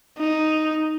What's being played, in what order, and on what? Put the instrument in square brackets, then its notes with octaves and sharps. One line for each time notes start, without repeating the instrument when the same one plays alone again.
[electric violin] D#4